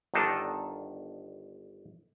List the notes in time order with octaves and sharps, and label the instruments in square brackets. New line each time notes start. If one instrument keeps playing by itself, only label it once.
[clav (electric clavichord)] G1 D#3 D4 D#4 A4 A5